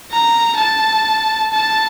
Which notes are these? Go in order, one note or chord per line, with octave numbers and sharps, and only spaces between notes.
A#5
A5
A5